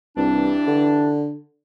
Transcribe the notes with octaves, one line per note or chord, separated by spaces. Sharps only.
C2 G2 E3 D4
D3